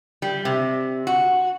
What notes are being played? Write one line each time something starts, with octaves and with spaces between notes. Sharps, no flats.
G3
C3
F#4